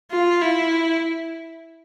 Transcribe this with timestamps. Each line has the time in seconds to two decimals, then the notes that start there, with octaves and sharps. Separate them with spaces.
0.11 F4
0.41 E4